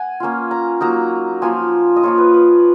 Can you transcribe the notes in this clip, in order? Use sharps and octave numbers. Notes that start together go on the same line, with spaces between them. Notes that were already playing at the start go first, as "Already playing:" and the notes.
Already playing: F#5 G#5
A#3 C#4 F4
A#5
F#3 A#3 D#4 A#5
F3 A#3 F4 G#5
D#5
F3 A#3 F4 C#5
B4
B4